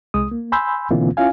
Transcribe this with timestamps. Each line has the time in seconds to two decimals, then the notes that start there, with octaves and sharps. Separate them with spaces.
0.14 C2 G#3 D#6
0.32 A#3
0.52 G#5 B5 C6 E6 G6
0.91 B2 D3 E3 A#3 C4 F4
1.17 C#4 E4 F4 F5 G#5